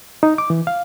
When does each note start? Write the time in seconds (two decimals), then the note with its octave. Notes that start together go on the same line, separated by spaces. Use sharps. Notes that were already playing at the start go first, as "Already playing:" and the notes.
0.23 D#4
0.38 D6
0.50 E3
0.67 F5